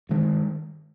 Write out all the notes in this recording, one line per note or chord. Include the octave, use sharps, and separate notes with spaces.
G2 D#3 G#3